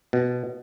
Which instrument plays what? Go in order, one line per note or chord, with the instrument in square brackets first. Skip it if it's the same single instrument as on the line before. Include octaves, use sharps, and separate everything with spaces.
[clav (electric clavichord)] B2